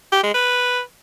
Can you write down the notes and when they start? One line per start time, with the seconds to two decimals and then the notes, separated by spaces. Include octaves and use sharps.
0.12 G4
0.23 G#3
0.34 B4